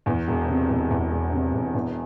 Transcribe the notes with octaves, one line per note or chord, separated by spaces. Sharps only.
E2
E1
C3
E1
E2
E1
C3
E1
E2